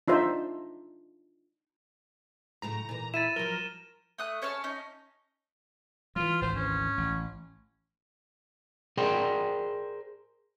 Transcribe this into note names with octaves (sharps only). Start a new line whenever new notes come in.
D4 D#4 F4 C5 E5
F#2 A2 C#3 A#5
A#2 E3
E4 A6 D#7 E7
F3 F#3 A#4 G7
A3 D#6 F#6
C#4 C#5 A5 F6
C#4 D#4
E3 F#3 F4
G#1 D2 E3 C5
C#4
A1
G#4 A#4 C5 D5 G5